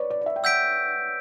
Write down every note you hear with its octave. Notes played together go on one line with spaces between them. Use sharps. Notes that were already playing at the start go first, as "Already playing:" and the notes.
Already playing: B4 C#5 D5
D5
D5
E5
G5
F#5 E6 G6 B6 D7